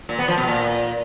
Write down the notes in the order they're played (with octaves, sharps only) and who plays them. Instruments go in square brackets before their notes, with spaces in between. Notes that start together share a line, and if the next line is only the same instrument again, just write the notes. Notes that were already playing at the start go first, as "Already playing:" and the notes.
[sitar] A#2
B3
F3
B2
A#2